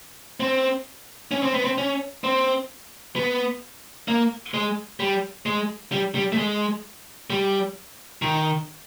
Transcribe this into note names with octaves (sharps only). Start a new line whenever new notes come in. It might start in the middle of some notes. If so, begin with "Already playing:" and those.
C4
C#4
C4
B3
C4
C#4
C4
B3
A#3
G#3
G3
G#3
G3
G3
A3
G#3
G3
D#3